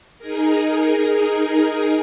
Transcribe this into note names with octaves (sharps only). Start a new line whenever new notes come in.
D#4 G#4 A#4